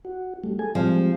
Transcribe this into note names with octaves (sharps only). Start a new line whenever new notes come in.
F#4
G3 A3
G#4 A4 G#5
F3 G3 G#3 C4